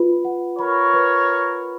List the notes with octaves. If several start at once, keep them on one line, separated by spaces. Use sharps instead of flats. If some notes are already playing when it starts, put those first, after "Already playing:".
Already playing: F4 B4 B5
F#5
A#4 C#5 B5
B4